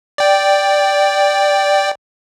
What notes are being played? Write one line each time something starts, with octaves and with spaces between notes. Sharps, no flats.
D5 G5